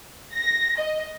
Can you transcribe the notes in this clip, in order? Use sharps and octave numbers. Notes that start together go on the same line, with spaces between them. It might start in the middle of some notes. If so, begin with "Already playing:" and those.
A#6
D#5